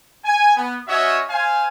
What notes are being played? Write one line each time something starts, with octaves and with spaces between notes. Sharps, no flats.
G#5
B3
C#4 F#4 C#5 D#5 E5
C5 F5 G#5